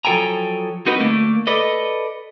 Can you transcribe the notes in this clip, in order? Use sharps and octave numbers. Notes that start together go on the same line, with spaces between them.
F3 F#3 A4 G5 G#5 A#5
C4 D#4 F#4 A#4 B4 D#5
D2 A3 A#3
A4 B4 D5 D#5